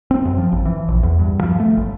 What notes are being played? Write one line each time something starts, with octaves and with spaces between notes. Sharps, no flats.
C4
F#2
F3
G#1
E3
A#1
E2
G2
F3
A3
G1